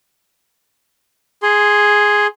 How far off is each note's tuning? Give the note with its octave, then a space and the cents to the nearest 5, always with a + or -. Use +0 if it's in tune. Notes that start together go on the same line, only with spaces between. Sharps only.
G#4 +0 C6 +0